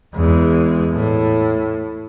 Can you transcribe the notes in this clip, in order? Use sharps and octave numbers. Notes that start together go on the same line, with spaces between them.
E2 G#3
A2